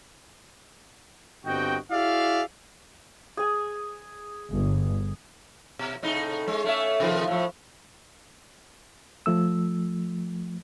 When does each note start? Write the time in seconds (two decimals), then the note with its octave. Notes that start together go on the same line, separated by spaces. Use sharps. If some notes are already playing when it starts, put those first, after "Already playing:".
1.45 G1 G2 C4 F#4 D#5 G5
1.91 E4 F#4 G#4 D5 E5 F5
3.37 G#4 G#5
4.51 G1
5.79 B2
6.03 A2 C3 D#4
6.48 G#3 C#4
6.64 A3 C#4 E5
7.00 C3 D#3 F3
7.28 A2 F3
9.26 F3 A3 E6